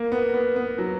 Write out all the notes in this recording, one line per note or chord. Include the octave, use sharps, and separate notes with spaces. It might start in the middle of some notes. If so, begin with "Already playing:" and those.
Already playing: A#3
B3
B3
B3
F#3